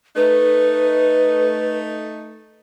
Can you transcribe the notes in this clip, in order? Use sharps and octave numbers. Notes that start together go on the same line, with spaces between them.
A3 D#4 B4